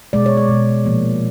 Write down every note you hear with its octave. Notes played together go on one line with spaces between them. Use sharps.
B2 G#3 D5
C#5
D5
B2 G#3
A#2 F3 A#3